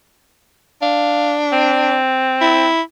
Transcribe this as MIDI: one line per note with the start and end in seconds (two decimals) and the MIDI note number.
0.82 1.96 62
0.82 1.34 77
1.52 2.68 60
2.41 2.81 64